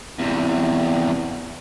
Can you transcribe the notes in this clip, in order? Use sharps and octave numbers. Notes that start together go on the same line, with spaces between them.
E2 C3